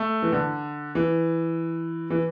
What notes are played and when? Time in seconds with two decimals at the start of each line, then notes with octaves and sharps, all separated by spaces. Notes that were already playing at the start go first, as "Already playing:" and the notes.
Already playing: A3
0.23 E3
0.32 D3
0.95 E3
2.10 E3